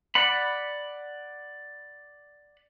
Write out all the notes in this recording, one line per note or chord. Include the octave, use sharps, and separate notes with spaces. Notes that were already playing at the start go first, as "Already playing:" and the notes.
D5 F#5 B5